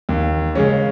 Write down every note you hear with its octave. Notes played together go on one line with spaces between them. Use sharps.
D#2
C#3 G#3 C#4